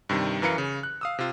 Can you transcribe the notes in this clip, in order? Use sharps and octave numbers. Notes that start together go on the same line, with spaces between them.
G2 C3 D#3 G3
F#2 E3 A#4 B4 F5 C#7
C#3
F#6
F5 D#6 E6
C3 F4